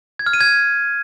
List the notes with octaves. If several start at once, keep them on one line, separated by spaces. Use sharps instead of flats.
G#6
F6
D#7
G#6